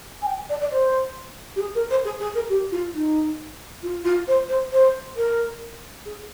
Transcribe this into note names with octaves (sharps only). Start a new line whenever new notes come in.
G#5
G5
D5
D5
C5
G4
G#4
A#4
C5
G#4
G#4
A#4
G4
F4
D#4
F4
F4
C5
C5
C5
A#4
G#4